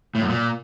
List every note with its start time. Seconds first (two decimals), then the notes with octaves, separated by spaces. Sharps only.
0.15 A2
0.22 F#2
0.29 A#2